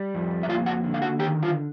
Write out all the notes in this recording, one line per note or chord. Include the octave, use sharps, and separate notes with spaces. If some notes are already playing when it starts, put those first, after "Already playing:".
Already playing: G3
F2
E5
A#3 F4 F5
F#4 F#5
D3
F5
F#4 F#5
D#3 G4 G5
F4 F5